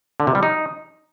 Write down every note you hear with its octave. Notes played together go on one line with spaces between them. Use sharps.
D3
C3
G3
D#4